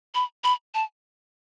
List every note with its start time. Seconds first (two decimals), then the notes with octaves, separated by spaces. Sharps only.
0.15 B5
0.44 B5
0.74 A5